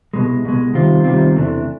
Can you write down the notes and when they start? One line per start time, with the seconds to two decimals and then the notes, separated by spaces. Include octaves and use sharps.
0.14 C2 B2 G#3
0.44 C2 B2 G#3
0.74 C3 D#3 G3 C4 F4
1.04 C3 D#3 G3 C4 F4
1.34 E2 C3 E3 A3 D4